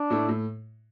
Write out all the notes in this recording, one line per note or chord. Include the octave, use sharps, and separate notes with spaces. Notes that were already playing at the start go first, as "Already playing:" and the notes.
Already playing: D4
A2 A3 E4
A2